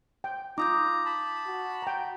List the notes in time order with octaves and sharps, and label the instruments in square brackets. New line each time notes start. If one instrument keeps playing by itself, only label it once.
[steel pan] G5
[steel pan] D#4 [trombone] F4 [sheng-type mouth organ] A#5 [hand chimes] D6 D#6 G6
[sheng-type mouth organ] A5 B5
[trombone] F#4
[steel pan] G5 A#5